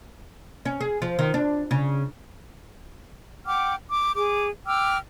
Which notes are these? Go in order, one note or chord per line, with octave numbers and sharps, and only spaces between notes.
C#4
G#4
F3
D#3
D4
C#3
F#5 G5 D6 F6
D6
G#4 D6
G5 D6 E6 F6